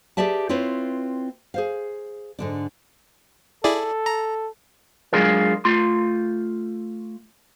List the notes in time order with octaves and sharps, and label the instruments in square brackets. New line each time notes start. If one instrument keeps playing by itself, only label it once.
[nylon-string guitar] G4 G#4 B4 D5 E5 A5
C4 E4 F4 B4 C#5
G#4 C5 F5
G#2 D3 D4
[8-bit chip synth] E4 G#4 D5 [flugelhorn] A4
[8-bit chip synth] A#5
[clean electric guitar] F#3 G#3 D4 F4 G#4 A#4
A3 F4 C6